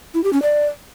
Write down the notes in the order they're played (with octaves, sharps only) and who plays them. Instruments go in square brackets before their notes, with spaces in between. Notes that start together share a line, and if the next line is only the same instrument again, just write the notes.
[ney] E4
G4
C#4
D5